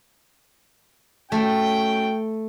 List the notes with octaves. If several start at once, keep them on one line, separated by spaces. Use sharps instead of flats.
A3 C#4 F#4 G5